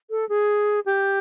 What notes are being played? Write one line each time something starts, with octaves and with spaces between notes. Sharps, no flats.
A4
G#4
G4